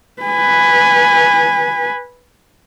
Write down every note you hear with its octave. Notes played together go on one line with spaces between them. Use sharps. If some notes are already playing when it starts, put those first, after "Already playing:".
B4 G#5